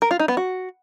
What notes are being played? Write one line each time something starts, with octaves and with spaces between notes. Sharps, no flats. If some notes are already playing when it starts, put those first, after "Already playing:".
A#4
F4
D#4
B3
F#4